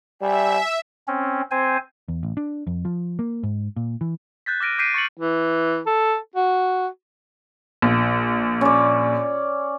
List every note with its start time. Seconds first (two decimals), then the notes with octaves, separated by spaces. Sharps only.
0.21 G3 E5 G#5
1.08 C4 C#4
1.51 C4 C5 G#5
2.08 E2
2.23 A1
2.37 D4
2.67 F2
2.85 F3
3.19 A#3
3.43 G#2
3.77 A#2
4.01 E3
4.46 F#6 G6 A6 B6
4.60 D6 F6 A#6 D7 D#7
4.79 D6 G6 B6 C7 D7 D#7
4.94 C#6 A6 C#7 F#7
5.18 E3
5.86 A4
6.36 F#4
7.82 A#1
8.61 C#4 D5